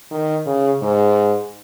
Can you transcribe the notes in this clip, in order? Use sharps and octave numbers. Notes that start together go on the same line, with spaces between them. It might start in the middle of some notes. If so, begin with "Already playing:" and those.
D#3
C#3
G#2